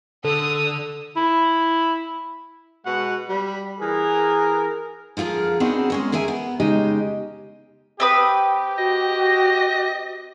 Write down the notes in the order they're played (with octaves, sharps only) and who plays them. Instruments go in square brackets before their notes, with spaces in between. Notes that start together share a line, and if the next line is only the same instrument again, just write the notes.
[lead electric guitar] D3 [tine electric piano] A4 [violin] D#6 E6
[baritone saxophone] E4
[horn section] B2 G#3 F#4 B4 F#5
G3 B5
E3 G#4 A#4
[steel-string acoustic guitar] D3 F3 F4 G#4 A#4
B3 C4 D4 D#4 F#4 G#4
G#3 C#4 A#4
D3 G#4 A#4 E5 G#5
B3
C#3 G#3 D#4 G4 D#5
[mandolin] C4 B4 D#6 [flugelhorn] G4 [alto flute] G5
[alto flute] F#4 [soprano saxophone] D#5